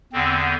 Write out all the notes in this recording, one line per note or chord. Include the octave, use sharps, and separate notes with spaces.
E2 D3 C4